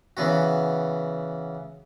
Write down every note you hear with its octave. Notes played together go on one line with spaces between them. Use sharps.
C#3 E3 B3 F#4